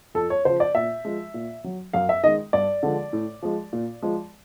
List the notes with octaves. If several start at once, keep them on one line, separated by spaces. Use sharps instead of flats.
F2 A4
C#5
C#3 F3 C5
D5
A#2 E5
F3 G#3
A#2
F#3
F#2 F5
E5
D#3 G#3 D#5
G2 D5
D3 F3 G#3
A2
F3 G#3
A#2
F3 G#3